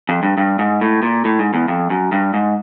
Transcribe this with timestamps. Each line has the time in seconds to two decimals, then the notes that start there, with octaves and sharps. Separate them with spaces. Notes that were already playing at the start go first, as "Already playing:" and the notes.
0.09 F2
0.23 G2
0.38 G2
0.59 G#2
0.81 A2
1.03 A#2
1.25 A2
1.39 G#2
1.54 E2
1.68 F2
1.90 F#2
2.12 G2
2.34 G#2